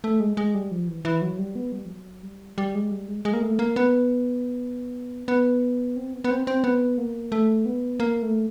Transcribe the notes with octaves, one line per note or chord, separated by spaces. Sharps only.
A3
G#3
G#3
G3
F3
E3
E3
F#3
G3
B3
G3
F3
F#3
G3
G3
G#3
G3
G#3
G#3
A#3
A3
A#3
B3
B3
C4
B3
B3
C4
C4
B3
A#3
A3
B3
A#3
A3